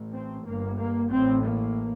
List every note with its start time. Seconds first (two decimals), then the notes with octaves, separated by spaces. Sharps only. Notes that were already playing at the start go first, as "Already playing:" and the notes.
Already playing: A1 A2
0.14 C4
0.45 G1 G2 A#3
0.78 A#3
1.10 A1 A2 C4
1.43 A#3